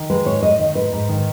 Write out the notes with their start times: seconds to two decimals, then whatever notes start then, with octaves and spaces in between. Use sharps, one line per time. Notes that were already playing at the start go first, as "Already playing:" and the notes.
Already playing: D#3
0.10 G#3 B4
0.26 G#2 C#5
0.42 G#2 D#5
0.59 D#3 D#5
0.75 G#2 B4
0.93 G#2
1.09 D#3